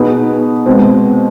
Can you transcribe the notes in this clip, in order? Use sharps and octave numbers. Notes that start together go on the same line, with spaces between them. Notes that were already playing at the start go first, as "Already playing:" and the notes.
Already playing: B2 B3 D#4 G#4 B4
B2 G#3 C4